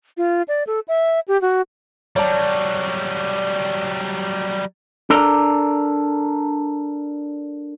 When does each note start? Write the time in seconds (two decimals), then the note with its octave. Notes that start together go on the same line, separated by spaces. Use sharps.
0.17 F4
0.48 D5
0.67 A4
0.88 E5
1.28 G4
1.42 F#4
2.16 F#3 G3 C#5 D5 A5
5.10 D4 A4 A#4 D5 A#5